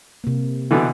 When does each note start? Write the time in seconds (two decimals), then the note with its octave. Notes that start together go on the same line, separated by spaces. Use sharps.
0.24 C3 A#3
0.71 B2 D3 E3